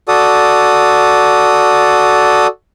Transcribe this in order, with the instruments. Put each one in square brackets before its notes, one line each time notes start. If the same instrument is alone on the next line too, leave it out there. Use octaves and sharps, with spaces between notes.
[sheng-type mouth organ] F#4 A4 D5 D#6